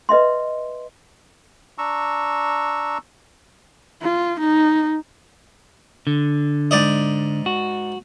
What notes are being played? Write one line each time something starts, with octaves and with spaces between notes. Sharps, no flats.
B4 D#5 E5 C6
D4 A#5 C#6 E6
F4
D#4
D3
G#2 D5 D#5
F#4